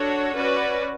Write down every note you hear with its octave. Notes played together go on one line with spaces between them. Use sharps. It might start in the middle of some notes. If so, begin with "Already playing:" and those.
Already playing: D4 F#4 A4 C#5
C#4 F#4 B4 D5